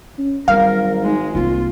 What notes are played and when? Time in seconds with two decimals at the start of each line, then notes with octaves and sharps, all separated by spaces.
0.18 C#4
0.48 G#1 F#3 G3 A#4 F5
1.03 G#3 D#4
1.35 C2 A#3 F4